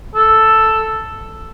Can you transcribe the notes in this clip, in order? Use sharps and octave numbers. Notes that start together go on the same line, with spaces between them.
A4